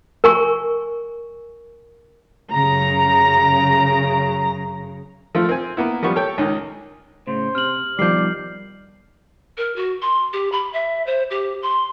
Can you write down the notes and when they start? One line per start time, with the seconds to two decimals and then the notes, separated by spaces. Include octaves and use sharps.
0.24 A#4 G#5 C#6
2.54 F#2 C#3 A#5
5.35 F3 A3 F4
5.49 C4 G#5
5.77 A#3 B3 E4
6.03 F3 G3 B3 C#6
6.16 A4 C#5 G5
6.38 C#2 D#3 C#4
7.27 A2 C#3 C5
7.55 C3 F6 F#7
7.99 B2 D#3 F3 G3 D5 G6 C7
9.57 A#4
9.76 F#4
10.02 C6
10.33 G4
10.52 B5
10.73 E5
11.07 C5
11.30 G4
11.62 C6